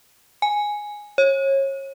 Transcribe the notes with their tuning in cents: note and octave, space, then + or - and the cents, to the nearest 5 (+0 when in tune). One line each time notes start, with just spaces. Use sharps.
G#5 +0
C#5 -30